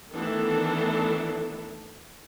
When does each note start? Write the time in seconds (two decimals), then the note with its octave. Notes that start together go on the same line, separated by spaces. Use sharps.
0.13 D#3 E3 A3 B3 D4 A4